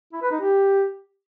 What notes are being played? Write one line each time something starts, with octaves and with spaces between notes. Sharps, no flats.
E4
B4
D#4
G4